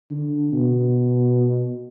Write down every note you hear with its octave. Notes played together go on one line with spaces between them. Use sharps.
D3
B2